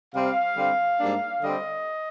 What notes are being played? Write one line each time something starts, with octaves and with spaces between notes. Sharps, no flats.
C3 G3 C4 F5
D3 G3 C4
G#2 G3 A#3 D4
D3 G3 C4 D#5